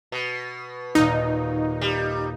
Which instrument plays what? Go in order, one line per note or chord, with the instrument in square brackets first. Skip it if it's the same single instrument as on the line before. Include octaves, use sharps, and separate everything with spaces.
[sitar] B2
[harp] D#2 A#2 [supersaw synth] D#4
[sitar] G3